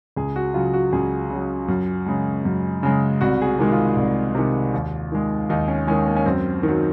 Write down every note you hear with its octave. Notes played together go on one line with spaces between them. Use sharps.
C#2 G#4
F#4
C#3 F#3 F4
F#4
C#2 G#4
C#3 F#3
F#2
C#3 G#3
F#2
C#3 G#3
C2 F#4
G#4
F#4
C3 D#3 G#3
F4
C2
C3 D#3 G#3
D#2
D#3 G#3
D#2 D#4
C#4
D#3 G#3 C#4
A#3
C#4
F#2 C4
D#3
F#3